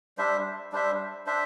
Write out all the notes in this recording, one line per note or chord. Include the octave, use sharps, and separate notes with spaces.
G3 D4 C5 E5
G3 D4 C5 E5
D4 C5 E5